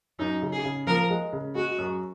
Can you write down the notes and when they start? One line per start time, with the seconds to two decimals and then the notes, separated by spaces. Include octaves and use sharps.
0.19 F#2 D#4
0.42 C#3
0.53 G#4
0.64 C#3
0.87 F3 A#4
1.10 G#3
1.33 C#3
1.55 G#3 F#4
1.78 F#2